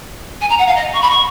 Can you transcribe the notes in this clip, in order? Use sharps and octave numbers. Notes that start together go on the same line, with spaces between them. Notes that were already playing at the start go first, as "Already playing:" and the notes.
G#5
A#5
F#5
F5
D#5
C#6
B5
C#6